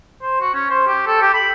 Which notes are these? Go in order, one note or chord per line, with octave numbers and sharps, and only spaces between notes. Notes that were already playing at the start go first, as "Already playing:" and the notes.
C5
F#4
C#4
C5
G4
A4
G4
B5